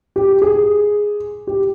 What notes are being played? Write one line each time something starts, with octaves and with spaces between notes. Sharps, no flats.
G4
G#4
G4